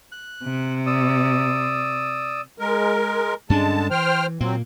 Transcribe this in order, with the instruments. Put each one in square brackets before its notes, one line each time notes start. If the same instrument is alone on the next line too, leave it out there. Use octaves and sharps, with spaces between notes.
[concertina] F#6
[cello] C3
[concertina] D5 D#6 E6
[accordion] G#3 A#4
[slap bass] G2 C#4 D4 [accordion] D3 G#3 A5
[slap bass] E3 [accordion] C5 G5 F6
[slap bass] A#2 A#3 [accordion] F#3 C4